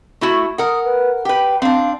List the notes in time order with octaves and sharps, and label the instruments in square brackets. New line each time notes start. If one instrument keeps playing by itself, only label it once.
[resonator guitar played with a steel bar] A3 E4 F#4
[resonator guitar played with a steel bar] A#4 F#5 [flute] D#6
[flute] B4
[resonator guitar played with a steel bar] G4 B4 [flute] G5
[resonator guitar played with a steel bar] C4 D4 [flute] F5